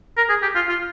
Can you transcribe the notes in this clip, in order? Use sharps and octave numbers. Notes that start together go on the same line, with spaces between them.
A#4
G#4
G4
F4
F4